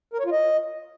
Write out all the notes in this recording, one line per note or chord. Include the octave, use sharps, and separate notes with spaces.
A#4
C#5
F4
D#5